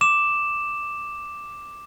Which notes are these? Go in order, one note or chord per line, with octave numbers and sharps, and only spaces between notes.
D6 E7